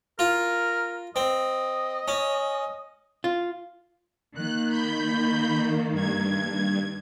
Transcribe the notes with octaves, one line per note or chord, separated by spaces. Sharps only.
F4 A#4
C4 D#5
C#4
F4
D#3 A#3 F#6
B5 G6
G2 G#6